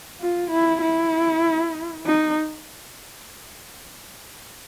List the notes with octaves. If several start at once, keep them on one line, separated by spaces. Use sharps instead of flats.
F4
E4
E4
D#4